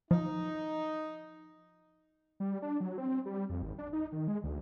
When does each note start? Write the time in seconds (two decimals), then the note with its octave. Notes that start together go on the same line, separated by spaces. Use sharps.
0.11 F3 D#4
2.40 G3
2.62 D4
2.80 F#3
2.98 C4
3.26 G3
3.50 F2
3.62 G#1
3.78 D4
3.93 D#4
4.12 D#3
4.28 G#3
4.44 D2